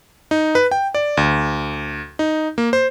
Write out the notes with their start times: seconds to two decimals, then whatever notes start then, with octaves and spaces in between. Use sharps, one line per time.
0.31 D#4
0.55 B4
0.71 G5
0.95 D5
1.17 D2
2.19 D#4
2.58 A#3
2.73 C5